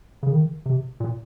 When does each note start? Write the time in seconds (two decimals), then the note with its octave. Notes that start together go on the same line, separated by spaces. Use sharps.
0.23 C#3
0.31 D#3
0.66 C3
1.00 A#2